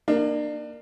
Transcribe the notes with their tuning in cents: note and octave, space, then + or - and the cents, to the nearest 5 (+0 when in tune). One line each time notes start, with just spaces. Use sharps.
A#3 +0 D4 +30